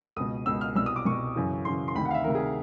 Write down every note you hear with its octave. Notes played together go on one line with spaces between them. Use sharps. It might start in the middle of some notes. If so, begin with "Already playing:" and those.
C#2 B2 D#6
C#2 B2 E6
F6
C2 B2 E6
D#6
D6
C2 B2 C#6
F#2 C#3 E3
F#2 C#3 E3 C6
C6
D2 C3 D#3 B5
F#5
F5
E5
D2 C3 D#3 A#4
G#4